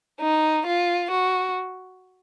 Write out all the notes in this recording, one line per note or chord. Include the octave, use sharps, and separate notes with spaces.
D#4
F4
F#4